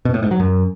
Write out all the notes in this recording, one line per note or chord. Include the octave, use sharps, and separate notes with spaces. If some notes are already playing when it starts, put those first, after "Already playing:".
B2
A2
G#2
F#3
F#2